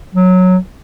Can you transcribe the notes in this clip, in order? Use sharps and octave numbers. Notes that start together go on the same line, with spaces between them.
F#3